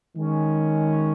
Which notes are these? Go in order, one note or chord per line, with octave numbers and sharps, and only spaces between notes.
D#3 G#3 C#4